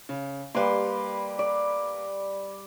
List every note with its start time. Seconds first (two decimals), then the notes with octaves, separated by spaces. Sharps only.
0.09 C#3
0.55 G3 A#3 B4 C6
1.39 D5